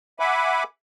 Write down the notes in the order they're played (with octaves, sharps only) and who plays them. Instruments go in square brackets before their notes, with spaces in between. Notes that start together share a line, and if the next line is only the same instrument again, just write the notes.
[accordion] E5 F#5 G#5 B5 D6